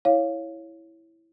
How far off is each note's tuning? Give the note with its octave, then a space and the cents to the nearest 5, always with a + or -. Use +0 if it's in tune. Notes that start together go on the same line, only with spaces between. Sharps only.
E4 +0 C#5 -5 F5 +0